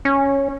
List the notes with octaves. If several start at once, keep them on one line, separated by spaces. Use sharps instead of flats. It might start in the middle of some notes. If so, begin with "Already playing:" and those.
C#4